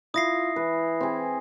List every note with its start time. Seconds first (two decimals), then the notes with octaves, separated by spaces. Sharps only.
0.14 E4 F4 D#6 A#6 C7
0.56 E3 B4
1.01 C4 G#4